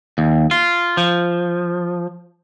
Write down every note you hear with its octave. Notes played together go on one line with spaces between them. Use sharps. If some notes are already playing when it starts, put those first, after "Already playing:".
D#2
F4
F3